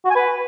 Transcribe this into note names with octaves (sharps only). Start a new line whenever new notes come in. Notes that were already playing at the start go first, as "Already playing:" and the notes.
F#4
G#5
B4